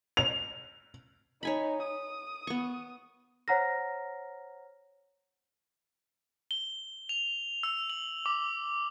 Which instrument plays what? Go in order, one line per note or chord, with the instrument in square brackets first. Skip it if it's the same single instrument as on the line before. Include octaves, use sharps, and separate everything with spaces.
[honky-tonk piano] F7
[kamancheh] D#4 [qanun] C#5 G#5 B5
[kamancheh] D#6
[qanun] B3 C#6
[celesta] C5 C#5 F#5 A#5 F6 A#6
[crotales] G7
F7
E6
F#7
D6